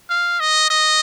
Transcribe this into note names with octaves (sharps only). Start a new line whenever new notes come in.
F5
D#5
D#5